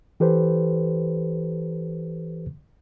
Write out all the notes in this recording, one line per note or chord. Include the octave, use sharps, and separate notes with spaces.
E3 G4 A4 B4 C5